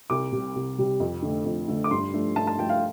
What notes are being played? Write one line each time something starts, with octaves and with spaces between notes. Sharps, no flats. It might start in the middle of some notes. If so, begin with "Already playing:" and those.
C2 D6
C3 G3
C2
C3 G3
F2
D3 A3
F2
D3 A3
D6
G2 C6
F3 A3 D4
G2 A5
A5
F3 A3 D4 G5
F5